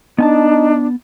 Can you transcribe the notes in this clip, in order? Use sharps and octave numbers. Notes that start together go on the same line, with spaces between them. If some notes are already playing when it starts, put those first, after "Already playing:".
B3 D4 D#4 G#5 A5